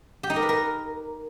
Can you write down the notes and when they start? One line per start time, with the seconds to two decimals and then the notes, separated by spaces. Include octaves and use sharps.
0.23 G4
0.30 D#4
0.36 A#4
0.42 B4
0.49 A#4